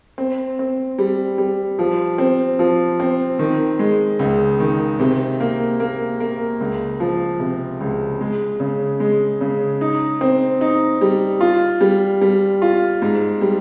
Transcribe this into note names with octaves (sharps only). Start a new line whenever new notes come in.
C4
C4
G3
G3
F3
C4
F3
C4
D#3
G#3
C#2
D#3
C3
A#3
A#3
A#3
C#2
F3
C3
C#2
G#3
C#3
G#3
C#3
D#4
C4
D#4
G3
F4
G3
G3
F4
G#2
G3